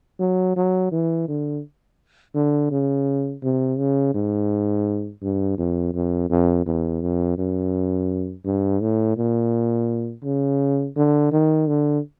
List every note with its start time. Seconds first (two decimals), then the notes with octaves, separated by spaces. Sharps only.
0.20 F#3
0.56 F#3
0.92 E3
1.28 D3
2.35 D3
2.71 C#3
3.43 C3
3.79 C#3
4.15 G#2
5.22 G2
5.58 F2
5.94 F2
6.30 F2
6.66 E2
7.02 F2
7.38 F#2
8.45 G2
8.81 A2
9.17 A#2
10.24 C#3
10.96 D3
11.32 D#3
11.68 D3